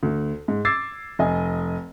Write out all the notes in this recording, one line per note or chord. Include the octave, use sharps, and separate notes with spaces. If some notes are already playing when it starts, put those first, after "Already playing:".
D2
G#2
D6 E6 G#6 A6 C7
F1 D#5 G#5